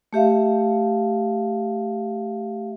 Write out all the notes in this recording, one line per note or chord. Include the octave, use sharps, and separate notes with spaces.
A3 G4 E5 F5